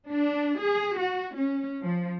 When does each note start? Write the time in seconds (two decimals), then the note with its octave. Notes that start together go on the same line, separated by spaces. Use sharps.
0.10 D4
0.62 G#4
0.97 F#4
1.36 C#4
1.83 F3